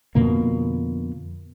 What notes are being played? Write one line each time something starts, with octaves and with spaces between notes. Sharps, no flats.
F2 B2 D3 A#3